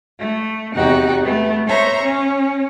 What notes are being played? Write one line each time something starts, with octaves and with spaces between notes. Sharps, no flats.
A3
E2 C3 D#4 F#4 G4 F#5
A3 B3
C5 C#5 E5 A#5 C6
C#4